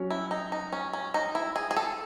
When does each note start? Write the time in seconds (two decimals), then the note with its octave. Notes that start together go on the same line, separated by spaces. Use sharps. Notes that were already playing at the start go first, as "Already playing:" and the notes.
Already playing: F#3 C#4 F#4 C#5
0.10 E4
0.31 D#4
0.52 D#4
0.73 C#4
0.93 C#4
1.14 D#4
1.35 E4
1.56 G#4
1.71 G#4
1.77 A4